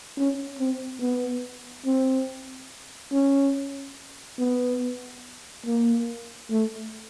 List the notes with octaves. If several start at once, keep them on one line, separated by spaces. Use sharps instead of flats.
C#4
C4
B3
C4
C#4
B3
A#3
A3